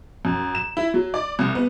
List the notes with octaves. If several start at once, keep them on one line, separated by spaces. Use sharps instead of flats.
F#2
E7
E4
F#3
D5
C2
B3